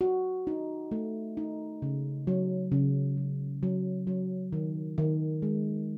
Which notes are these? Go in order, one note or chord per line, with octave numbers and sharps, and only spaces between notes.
F#4
D#4
A3
D#4
C#3
F#3
C#3
F#3
F#3
F#3
D#3
D#3
G#3